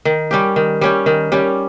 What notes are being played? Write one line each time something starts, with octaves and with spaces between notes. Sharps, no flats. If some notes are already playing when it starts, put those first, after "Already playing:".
D#3
G3 C#4 G4
D#3
G3 C#4 G4
D#3
G3 C#4 G4